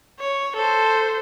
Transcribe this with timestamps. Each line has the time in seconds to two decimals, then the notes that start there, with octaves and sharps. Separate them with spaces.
0.20 C#5
0.56 A4 C5